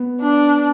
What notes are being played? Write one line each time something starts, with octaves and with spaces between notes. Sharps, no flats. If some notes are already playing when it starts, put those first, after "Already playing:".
Already playing: B3
D4